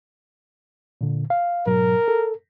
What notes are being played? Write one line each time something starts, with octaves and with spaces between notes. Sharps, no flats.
A#2 D3
F5
G#2 B2 F#3 A#4
A4